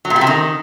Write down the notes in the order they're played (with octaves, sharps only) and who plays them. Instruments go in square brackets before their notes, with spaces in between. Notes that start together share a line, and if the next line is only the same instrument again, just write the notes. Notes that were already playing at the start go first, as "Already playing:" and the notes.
[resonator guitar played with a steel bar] F#3
A#2
G3
C3
D#3